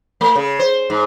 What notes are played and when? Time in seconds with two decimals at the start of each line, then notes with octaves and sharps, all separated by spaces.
0.21 A3
0.36 C#3
0.59 C5
0.90 G#2